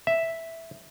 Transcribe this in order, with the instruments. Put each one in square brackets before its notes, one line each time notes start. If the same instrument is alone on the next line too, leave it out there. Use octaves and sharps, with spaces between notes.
[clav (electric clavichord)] E5